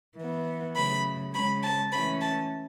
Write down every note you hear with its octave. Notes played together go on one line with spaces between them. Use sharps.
E3 B3
C#3 F#3 A3 B5
C#3 G#3 C#4 B5
A5
E3 A3 C#4 B5
A5